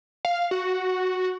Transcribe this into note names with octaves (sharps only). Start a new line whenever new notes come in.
F5
F#4